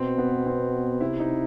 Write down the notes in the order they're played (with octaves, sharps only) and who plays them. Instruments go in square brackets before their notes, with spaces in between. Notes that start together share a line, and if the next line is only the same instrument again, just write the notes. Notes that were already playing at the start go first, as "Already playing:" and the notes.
Already playing: [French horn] B2 [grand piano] C4
[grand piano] B3
C4
[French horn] C3 [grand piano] E4
[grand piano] D#4